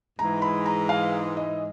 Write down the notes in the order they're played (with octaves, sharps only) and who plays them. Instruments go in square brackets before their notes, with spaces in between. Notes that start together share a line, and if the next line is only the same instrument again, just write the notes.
[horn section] G#2 E3 G#3 [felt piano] A#5
[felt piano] B5
A#5
F5
D#5